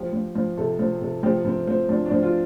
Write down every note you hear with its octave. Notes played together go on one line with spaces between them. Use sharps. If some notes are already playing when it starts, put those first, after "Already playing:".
Already playing: F3 G4
F3
F3
C3 A4
F3
C3
F3 G4
F3 C4
F3 C4
F3 D4
D4
F3
F4